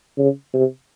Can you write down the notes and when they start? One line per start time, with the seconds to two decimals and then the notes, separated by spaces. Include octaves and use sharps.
0.18 C#3
0.54 C3